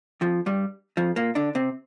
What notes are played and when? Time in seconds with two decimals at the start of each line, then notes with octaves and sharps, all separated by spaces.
0.21 F2 F3
0.46 G2 G3
0.97 F2 F3
1.16 A#2 A#3
1.35 D3 D4
1.55 C3 C4